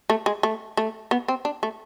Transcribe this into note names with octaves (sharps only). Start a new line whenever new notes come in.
A3
G#3
A3
A3
B3
C4
D4
A3